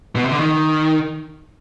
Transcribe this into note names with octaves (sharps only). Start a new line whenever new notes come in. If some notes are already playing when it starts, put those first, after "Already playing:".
B2
C3
D3
D#3